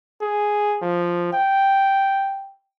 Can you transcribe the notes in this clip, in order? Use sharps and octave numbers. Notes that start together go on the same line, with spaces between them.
G#4
F3
G5